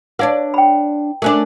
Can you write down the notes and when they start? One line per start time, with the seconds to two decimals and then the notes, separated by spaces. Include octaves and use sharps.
0.19 D4 B4 C#5 D5 F5
0.54 G5 B5
1.22 A3 C#4 D4 A#4 C5